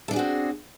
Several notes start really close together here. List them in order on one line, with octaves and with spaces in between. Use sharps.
A4 D4 G#4 F#4 C4